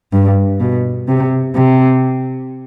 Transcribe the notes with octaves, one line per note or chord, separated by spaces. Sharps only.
G2
B2
C3
C3